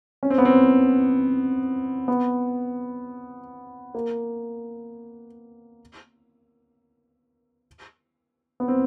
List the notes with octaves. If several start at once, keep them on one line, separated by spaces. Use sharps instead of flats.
C#4
C4
B3
C4
B3
A#3
B3
C4